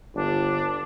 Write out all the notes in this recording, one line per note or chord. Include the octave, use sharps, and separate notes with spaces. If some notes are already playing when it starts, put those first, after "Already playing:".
G1 D4